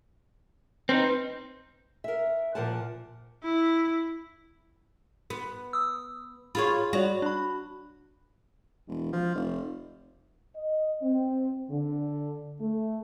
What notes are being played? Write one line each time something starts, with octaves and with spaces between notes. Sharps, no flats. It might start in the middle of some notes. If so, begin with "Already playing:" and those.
C4 C#4 D#4 B4 C6 G6
A#4 E5
A#2 F3 A#4 C5 F#5 A5
E4
B3
D#6 E6
F4 G#4 C#5 B5
G3 F#4 C#5 D5
D4 B5
E1
F3
F1
D#5
C4
D3
A3